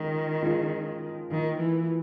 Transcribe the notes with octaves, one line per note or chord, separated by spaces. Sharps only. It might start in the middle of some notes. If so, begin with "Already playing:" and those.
Already playing: D#3 F3 G#3 C#4
F3 G#3 C#4 F4
D#3 F3 A#3 D#4
E3